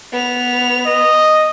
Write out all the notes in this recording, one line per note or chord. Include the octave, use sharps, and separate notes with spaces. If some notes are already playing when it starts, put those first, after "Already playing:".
B3 F7
D#5